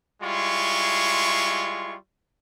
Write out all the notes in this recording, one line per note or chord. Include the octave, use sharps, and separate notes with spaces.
G3 G#3 E4 F4 C6 C#6